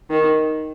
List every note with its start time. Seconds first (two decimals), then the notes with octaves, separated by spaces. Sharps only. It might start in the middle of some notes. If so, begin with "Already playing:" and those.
0.10 D#3